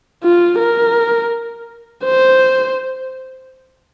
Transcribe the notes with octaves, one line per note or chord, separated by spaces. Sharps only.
F4
A#4
C5